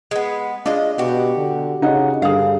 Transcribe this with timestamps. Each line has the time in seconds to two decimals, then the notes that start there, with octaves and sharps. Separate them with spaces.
0.11 G#3 B3
0.66 G#3 D4 F4 D#5
0.98 B2 F#4 G4
1.37 D3
1.82 C#3 D#4 F#5
2.22 G2 D3 G#4 F5